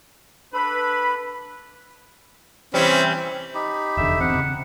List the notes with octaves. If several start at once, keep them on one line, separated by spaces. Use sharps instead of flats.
D4 A4 B4 B5
C3 E3 G3 C4 C#4
D#4 G4 B5
F1 E2 D3 E5
D1 E2 C4 F#5
C#3